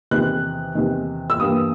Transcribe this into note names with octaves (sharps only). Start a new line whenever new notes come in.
E2 C3 D#3 F#6
E2 C3 D#3
E6
G2 E3 G3 A#3 D#6